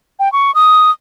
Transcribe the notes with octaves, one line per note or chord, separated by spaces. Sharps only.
G5
C#6
D#6